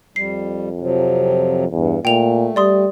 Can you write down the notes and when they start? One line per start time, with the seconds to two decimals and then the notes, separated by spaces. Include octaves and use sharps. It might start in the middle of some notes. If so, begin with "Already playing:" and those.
0.16 F2 G3 C7
0.80 C3 F3 F#3
1.71 E2 G2
2.05 A#2 A3 G5 F7
2.56 G3 D5 C6 D#6